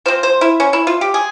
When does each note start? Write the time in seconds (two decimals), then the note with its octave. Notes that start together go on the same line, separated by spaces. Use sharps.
0.06 F3 C4 C5
0.23 C5
0.41 E4
0.60 C#4
0.73 E4
0.87 F4
1.01 G4
1.14 G#4